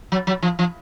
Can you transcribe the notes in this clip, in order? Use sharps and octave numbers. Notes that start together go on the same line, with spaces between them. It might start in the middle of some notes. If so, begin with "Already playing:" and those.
F#3
F#3
F3
F3